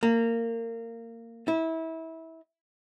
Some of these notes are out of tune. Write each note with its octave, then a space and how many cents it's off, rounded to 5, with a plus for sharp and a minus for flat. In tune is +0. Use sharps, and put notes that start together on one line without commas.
A#3 -20
E4 -25